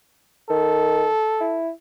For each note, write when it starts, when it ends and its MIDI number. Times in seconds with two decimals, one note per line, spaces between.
0.50 1.07 51
0.50 1.61 69
1.40 1.70 64